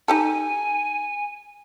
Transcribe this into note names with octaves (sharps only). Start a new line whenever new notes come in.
D#4 G4 A4 G#5